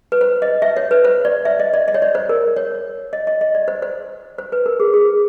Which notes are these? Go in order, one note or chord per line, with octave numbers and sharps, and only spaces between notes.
B4
C5
D#5
E5
C#5
B4
C5
D5
E5
D#5
D5
D#5
C#5
D5
C5
A#4
C#5
D#5
D#5
D#5
D5
C5
C5
C5
B4
A#4
G#4
G#4